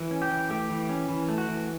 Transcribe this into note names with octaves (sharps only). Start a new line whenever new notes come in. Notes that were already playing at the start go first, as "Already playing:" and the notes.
Already playing: E3
C#4
G4
E3
A3 G4
E3
C#4
E3
A3
F#4
E3